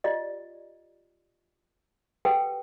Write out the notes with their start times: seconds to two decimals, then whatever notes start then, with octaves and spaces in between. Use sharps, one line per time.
0.04 F4 G4 D5 D#5
2.25 G4 A4 B4 F#5 G5